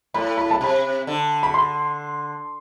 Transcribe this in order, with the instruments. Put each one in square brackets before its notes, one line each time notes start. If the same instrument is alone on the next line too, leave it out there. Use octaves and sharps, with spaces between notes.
[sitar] A2 [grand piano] B5
[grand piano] B5
A5
[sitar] C3 [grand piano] B5
[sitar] D3
[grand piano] B5
C6